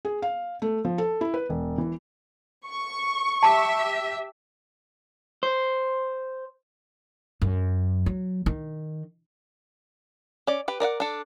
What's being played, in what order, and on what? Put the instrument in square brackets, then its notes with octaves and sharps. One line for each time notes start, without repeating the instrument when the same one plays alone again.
[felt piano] G#4
F5
A3
F3
A4
E4
B4
E1
E3
[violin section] C#6
[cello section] G4 E5 [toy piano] A5 D6
[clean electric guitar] C5
[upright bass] F#2
F#3
D#3
[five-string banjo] C#4 D5
G4 B4
A#4 D5 E5 F#5
D4 A4